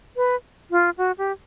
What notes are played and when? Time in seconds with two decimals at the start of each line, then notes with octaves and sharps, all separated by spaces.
0.17 B4
0.71 F4
0.98 F#4
1.18 G4